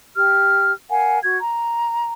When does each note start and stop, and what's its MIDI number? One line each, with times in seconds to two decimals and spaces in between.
0.15 0.72 67
0.15 0.72 89
0.90 1.19 70
0.90 1.19 77
0.90 1.19 78
0.90 1.19 80
1.23 1.37 66
1.23 1.37 92
1.40 2.12 82